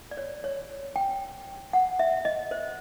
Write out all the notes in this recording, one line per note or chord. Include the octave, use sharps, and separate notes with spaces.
D5
C#5
C#5
G5
F#5
E5
D#5
C5